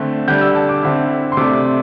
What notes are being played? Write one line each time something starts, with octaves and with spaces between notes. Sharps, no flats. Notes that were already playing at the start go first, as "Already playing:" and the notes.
Already playing: D3 A3 C4
D3 G3 D4 G6
E6
A5
D6
D3 C4 E4
C6
C3 A3 D4 D6